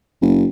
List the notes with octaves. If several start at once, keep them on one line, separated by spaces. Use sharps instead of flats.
F#1